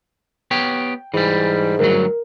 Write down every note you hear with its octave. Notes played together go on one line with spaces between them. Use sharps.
B3 G4 C#5 G5
G#2 E3 G3
D2 G2 F#3 A#4